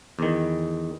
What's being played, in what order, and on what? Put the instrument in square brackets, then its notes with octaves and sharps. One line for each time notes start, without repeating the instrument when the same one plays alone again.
[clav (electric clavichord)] E2 D#3